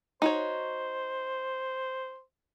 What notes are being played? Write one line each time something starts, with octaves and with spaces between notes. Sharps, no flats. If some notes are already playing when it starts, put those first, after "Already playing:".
D#4 F#4 C5 C#5